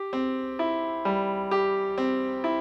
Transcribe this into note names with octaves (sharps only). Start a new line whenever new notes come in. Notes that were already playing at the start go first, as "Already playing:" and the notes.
Already playing: G4
C4
E4
G3
G4
C4
E4